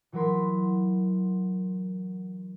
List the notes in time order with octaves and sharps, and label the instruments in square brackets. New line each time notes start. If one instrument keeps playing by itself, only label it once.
[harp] E3 F#3 F#4 A#4 B5 C6